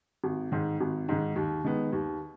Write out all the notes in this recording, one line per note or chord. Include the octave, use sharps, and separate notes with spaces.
G#1
G#2 D#3
G#1
G#2 D#3
D#2
D#3 G#3 B3
D#2